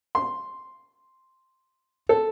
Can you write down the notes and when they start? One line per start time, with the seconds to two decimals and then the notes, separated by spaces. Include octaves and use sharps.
0.15 C6
2.09 A4